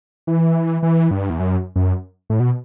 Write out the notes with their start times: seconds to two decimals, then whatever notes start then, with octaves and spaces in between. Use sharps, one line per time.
0.27 E3
0.83 E3
1.11 G2
1.30 E2
1.39 F#2
1.76 F#2
2.30 A2
2.40 B2